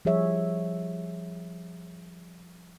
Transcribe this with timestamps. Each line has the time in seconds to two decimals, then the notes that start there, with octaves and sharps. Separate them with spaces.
0.05 F3 G3 G#4 C#5 E5